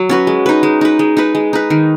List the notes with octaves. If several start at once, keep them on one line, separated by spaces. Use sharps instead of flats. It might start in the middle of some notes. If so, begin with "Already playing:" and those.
Already playing: F#3
C#4 F#4 B4
G#3
D#4 B4
G#3
D#4 B4
G#3
D#4 B4
G#3
D#4 B4
D#3